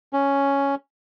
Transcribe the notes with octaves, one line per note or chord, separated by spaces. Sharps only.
C#4